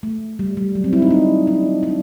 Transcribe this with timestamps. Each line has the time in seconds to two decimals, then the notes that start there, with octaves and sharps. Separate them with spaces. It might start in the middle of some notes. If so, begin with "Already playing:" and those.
0.03 A3
0.39 G3
0.57 G3
0.75 F#3
0.84 C4
0.93 E4
1.02 D#4
1.11 D4
1.47 D4
1.83 D4